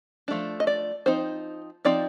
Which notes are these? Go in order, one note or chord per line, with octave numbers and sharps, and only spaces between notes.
F3 A3 D4
D#5
D5
F3 C4 D#4 C5
F3 C4 D#4 D5